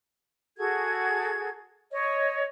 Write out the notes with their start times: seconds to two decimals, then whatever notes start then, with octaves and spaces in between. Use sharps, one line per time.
0.57 F#4 G#4 A4 G#6
1.91 C#5 D#5